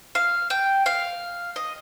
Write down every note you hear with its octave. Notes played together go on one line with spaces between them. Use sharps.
F5
G5
F5
D#5